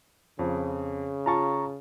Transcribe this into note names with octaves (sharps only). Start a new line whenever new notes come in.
F2 C#3
F4 A5 A#5 C#6